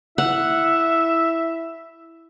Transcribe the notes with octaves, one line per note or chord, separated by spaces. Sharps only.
E4 E5 F#5